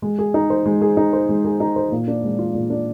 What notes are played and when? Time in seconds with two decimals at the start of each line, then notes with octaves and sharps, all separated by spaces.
0.02 G#3
0.19 G#4
0.34 D#4
0.50 C5
0.66 G#3
0.81 G#4
0.97 D#4
1.13 C5
1.29 G#3
1.45 G#4
1.60 D#4
1.76 C5
1.92 A#2
2.08 D4
2.23 G#3
2.39 F4
2.54 A#2
2.70 D4